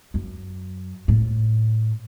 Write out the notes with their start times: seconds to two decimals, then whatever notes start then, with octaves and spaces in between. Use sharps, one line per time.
0.14 F#2
1.08 A2